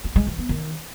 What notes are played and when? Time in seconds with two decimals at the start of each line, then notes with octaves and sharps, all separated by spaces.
0.04 C4
0.16 G#3
0.27 E3
0.38 B3
0.49 D#3